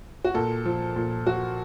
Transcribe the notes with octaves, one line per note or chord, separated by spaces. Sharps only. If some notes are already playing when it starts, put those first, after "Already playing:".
F#4
A#2 A4
F3
A#2
F3 F#4